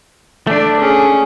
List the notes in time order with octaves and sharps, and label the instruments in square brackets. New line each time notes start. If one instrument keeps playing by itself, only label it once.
[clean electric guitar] A3 D4 [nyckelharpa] D5
[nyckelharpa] C#4 G#4